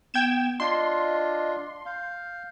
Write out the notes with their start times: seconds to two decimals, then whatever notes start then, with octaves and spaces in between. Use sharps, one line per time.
0.14 B3 G5 G#6 E7
0.60 D4 F4 D#5 C6
1.86 F5 G6